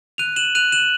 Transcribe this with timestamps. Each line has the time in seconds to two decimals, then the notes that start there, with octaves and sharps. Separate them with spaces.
0.18 F#6 D#7 F7
0.36 E7 F#7
0.55 F#6 D#7 F7
0.72 E7 F#7